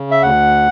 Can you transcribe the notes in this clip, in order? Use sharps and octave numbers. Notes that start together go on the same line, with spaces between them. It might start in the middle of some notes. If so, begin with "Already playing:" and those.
Already playing: C#3
E5
D2 F#5